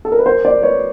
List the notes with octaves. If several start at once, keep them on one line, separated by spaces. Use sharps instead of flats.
A4
A#4
B4
A#4 C5
C5 D5
B4 C#5